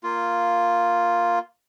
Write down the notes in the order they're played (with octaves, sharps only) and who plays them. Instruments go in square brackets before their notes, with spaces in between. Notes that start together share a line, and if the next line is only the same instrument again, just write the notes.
[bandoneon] A#3 F4